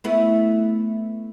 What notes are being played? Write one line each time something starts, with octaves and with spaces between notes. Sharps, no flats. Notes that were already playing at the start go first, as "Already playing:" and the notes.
A3 B3 E4